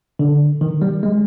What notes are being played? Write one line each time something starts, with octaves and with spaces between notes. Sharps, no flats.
D3
D#3
G3
G#3